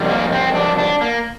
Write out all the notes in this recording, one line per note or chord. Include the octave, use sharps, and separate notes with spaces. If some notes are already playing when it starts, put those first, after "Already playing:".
Already playing: F2 D#3 G3
A#3
C4
D4
D4
A#3